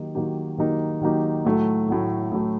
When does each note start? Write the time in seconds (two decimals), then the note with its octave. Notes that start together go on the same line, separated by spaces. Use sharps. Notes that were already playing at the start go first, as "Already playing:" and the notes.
Already playing: D#3 F#3 A#3 D#4 G4
0.15 D#3 F#3 A#3 D#4 G4
0.58 D#3 F#3 A#3 D#4 G4
1.01 D#3 F#3 A#3 D#4 G4
1.45 A2 F#3 A3
1.88 A2 F#3 A3
2.32 A2 F#3 A3